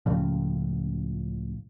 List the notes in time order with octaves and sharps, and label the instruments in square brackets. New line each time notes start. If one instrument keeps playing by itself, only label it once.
[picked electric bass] C#2 A2 C#3 F3